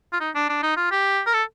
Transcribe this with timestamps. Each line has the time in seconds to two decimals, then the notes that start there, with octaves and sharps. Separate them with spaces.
0.13 F4
0.21 D#4
0.35 D4
0.49 D4
0.63 D#4
0.77 F4
0.91 G4
1.26 A#4
1.33 A4